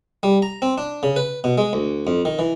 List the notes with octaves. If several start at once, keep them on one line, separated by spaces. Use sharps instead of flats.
G3
A#5
C4
D4
C#3
B4
B2
G#3
D2
F2
D#3
E3